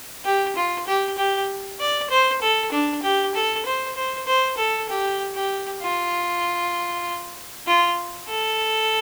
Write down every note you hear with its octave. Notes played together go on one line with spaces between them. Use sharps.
G4
F4
G4
G4
D5
C5
A4
D4
G4
A4
C5
C5
C5
A4
G4
G4
F4
F4
A4